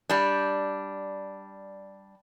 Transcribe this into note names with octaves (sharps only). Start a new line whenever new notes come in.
G3 D4